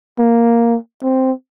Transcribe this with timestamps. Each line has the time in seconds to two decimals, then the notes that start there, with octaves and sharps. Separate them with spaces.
0.19 A#3
1.03 C4